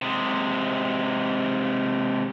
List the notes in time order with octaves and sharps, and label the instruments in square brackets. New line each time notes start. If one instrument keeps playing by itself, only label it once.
[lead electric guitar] C3 G#3